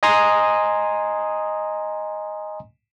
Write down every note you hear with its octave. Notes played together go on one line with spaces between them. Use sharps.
D#5 G#5 A#5 C6 D#6